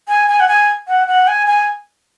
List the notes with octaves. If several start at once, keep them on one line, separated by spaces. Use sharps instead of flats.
G#5
G#5
F#5
G#5
F#5
F#5
G#5
G#5